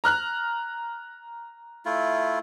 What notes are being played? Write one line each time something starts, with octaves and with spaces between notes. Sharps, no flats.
A#5 F6 F#6
A3 E4 F4